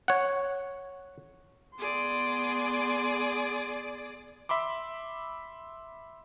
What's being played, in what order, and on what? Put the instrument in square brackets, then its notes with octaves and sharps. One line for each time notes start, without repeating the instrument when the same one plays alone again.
[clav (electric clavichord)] C#5 F#5
[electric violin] B3 C6 [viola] G#4 D5
[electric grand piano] E5 B5 C6 D6